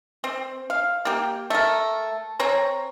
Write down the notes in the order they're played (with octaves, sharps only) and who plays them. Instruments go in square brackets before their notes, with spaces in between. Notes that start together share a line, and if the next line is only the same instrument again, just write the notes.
[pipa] C4
F5
A#3 G4
A3 A#4
C4 C#5 A#5